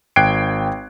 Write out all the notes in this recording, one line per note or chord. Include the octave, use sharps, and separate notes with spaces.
G#1 G5 F#6 G#6 C7 D7